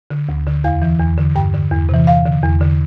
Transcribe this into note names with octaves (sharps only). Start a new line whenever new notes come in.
D3
D2
D3
E2 F5
E3
E2
D3
G2 G5
D3
E2
C3 E3
E2 F5
D3
E2
D3